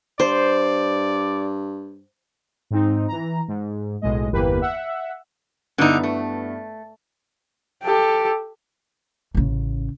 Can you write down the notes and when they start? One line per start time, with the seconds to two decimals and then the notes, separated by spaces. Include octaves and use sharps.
0.20 G2 C5 D5
2.71 G#2 C4 D#4
3.08 E3 A#5
3.48 G#2
4.02 B1 A2 G#3 D#5
4.32 G1 E2 E3 A#3 G4 B4
4.61 E5 F#5
5.78 G2 D3 B3 D#4 E4
6.03 A3
7.83 G4 A4
9.35 A1 C#3